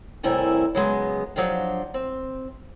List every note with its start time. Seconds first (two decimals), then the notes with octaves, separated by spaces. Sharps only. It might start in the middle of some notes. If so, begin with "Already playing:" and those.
0.23 A2 C3 G3 E4 A#4 G#5
0.75 C#3 F#3 G#3 B3
1.36 F3 F#3 D4 G4 F5
1.94 C4